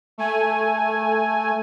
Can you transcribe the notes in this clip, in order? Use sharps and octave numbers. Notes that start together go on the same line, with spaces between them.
A3 G#5